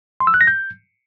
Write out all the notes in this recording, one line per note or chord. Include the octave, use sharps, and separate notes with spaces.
C6
E6
F#6
A#6
G6